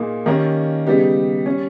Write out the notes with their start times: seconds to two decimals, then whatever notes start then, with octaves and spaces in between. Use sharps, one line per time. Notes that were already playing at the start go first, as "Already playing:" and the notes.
Already playing: A#2 A#3 D#4 G#4
0.26 D#3 A#3 C#4 G4 A#4
0.87 C#3 G3 B3 D#4 G4
1.46 G3 C#4